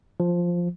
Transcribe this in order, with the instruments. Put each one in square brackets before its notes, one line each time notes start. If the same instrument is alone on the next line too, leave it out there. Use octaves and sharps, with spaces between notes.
[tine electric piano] F3